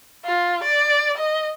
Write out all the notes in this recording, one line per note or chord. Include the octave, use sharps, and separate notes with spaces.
F4
D5
D#5